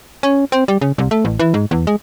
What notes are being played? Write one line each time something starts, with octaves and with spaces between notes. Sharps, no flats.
C#4
C4
G3
C#3
C2
A3
A1
E3
G#2
E2
G#3